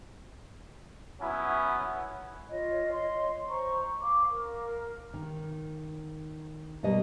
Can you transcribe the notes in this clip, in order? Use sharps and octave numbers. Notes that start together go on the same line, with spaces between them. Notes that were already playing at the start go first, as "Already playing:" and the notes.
F#3 B3 C#4 E4
F4 C#5 D#5
C#5 D#5 C6
C5 A#5 C#6
F5 D6
A#4 F5
D#3
B2 G3 A#3 D#5